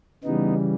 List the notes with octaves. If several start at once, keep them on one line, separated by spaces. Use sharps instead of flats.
C#3 E3 G3 B3 D#4